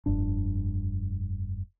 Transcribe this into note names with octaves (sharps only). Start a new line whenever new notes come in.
F1 G2 D4